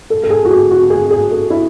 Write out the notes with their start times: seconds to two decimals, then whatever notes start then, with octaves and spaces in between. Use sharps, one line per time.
0.10 A4
0.24 A4
0.30 G#4
0.45 F#4
0.51 G#4
0.71 F#4
0.90 G#4
1.11 G#4
1.31 A4
1.50 E4